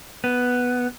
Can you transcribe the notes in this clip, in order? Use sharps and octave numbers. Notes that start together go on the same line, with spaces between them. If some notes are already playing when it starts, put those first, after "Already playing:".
B3